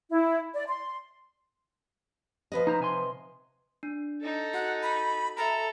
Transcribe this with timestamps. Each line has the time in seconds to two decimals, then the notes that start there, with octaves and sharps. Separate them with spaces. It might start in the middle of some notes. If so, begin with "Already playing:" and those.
0.11 E4
0.54 D5
0.68 C6
2.52 F3 B4 D#5
2.67 D#4 C5 A#5
2.80 C3 G#5 C6
3.83 D4
4.22 D#4 A4
4.54 F#4 F#5
4.83 B5
5.37 A4 E5 A#5 B5